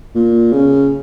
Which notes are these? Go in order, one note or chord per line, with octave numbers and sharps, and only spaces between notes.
A#2
C#3